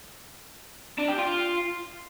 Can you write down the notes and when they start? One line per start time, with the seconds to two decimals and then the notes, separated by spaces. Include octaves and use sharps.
0.99 D4
1.09 G4
1.19 F4